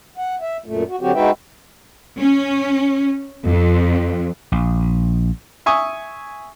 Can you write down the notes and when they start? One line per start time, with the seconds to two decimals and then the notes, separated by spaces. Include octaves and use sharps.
0.18 F#5
0.41 E5
0.66 F#2 A#2 A3
0.89 F#4
1.01 D3 F#3 C4 F#4 G4
1.15 G#3 D#4 F#4 B4 E5 G5
2.20 C#4
3.45 F2
4.52 A#1
5.66 E5 G#5 C#6 D#6